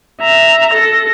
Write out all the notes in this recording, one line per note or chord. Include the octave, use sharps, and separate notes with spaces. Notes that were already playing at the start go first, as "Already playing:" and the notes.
E5 A#5
A4 A#6